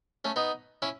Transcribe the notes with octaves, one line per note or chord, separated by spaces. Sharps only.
A3 C#4
B3 D#4
C#4 E4